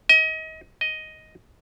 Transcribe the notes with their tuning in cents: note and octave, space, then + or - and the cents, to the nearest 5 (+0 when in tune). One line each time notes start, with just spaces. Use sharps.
D#5 +30
D#5 +5